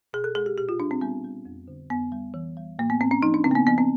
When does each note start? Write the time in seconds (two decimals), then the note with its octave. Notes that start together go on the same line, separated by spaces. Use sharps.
0.13 B2 G#4
0.24 A4
0.35 G#3 G#4
0.46 G4
0.58 A#2 G4
0.69 F4
0.80 G3 D4
0.91 C4
1.01 G3 B3
1.24 G3
1.45 F2
1.68 D3
1.90 F2 B3
2.12 G3
2.34 E3
2.57 G3
2.79 A2 A#3
2.90 B3
3.01 A2 C4
3.11 C#4
3.22 F3 D#4
3.34 D4
3.44 C#3 C4
3.51 A#3
3.55 B3
3.67 F3 B3
3.78 C4